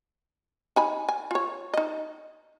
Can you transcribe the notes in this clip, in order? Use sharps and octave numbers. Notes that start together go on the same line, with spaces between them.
D#4 G#5 B5
G#5
F4 C#5
D#4 D#5